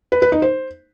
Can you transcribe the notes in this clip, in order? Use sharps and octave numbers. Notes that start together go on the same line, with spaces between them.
B4
B4
D#4
C5